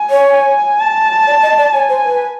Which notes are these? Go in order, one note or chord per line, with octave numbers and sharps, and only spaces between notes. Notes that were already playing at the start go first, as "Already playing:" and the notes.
Already playing: G#5
C#5
G#5
A5
D5
D#5
D5
C#5 G#5
C5
B4